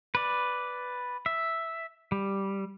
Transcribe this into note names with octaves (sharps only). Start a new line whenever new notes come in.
B4 D5
E5
G3